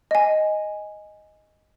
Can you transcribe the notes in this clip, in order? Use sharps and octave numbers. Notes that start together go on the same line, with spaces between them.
D#5 G#5